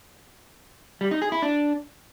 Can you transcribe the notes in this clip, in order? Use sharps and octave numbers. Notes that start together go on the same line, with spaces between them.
G3
D#4
G#4
E4
D4